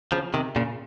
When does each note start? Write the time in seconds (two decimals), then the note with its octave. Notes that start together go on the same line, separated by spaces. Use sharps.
0.12 C#3 F3
0.34 C3 D#3
0.56 A#2 C#3